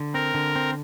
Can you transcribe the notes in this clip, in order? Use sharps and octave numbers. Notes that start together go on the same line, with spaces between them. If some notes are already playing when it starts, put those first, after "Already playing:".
Already playing: D3
C4 A#4
D3
C4